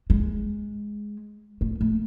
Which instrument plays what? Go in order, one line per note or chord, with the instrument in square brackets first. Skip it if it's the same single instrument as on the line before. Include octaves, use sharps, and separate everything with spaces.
[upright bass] G#3
A3
A3